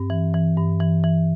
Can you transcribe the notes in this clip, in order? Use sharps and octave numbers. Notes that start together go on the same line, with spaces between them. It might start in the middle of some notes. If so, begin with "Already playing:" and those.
Already playing: G2 C4
E3
E3
G2
E3
E3